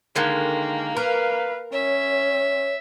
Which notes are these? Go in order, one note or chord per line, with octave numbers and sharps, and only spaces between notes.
D3 D#3 G#3 A#3
A#4 B4 F5
C#4 C#5 E5